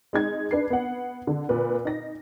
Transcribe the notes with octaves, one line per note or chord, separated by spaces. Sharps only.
G#3 D#4 G#6
D4 B4 C7
B3 F#5
D3
A#2 B4
D#4 A#6